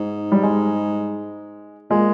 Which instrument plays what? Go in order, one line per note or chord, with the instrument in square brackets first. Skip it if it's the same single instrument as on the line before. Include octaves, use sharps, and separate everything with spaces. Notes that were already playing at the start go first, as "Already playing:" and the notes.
Already playing: [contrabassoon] G#2
[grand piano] G3
G#3
[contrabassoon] A#2 [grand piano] G#3